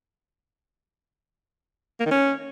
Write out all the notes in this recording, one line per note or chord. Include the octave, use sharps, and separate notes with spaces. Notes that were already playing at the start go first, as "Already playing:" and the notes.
A#3
D#3
C#4